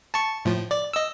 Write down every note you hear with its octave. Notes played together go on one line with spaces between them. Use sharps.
A5 C#6
A2 F3
D5
D#5 E6